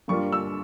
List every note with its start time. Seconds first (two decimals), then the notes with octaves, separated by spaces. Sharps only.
0.08 G2 G3 A#3 F4 C#6
0.32 E6